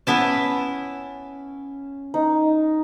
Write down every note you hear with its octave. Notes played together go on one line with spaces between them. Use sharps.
B3 C#4 E4 A5
D#4